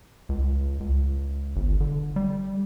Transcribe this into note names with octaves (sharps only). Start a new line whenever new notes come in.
C#2
C#2
G1
D3
G3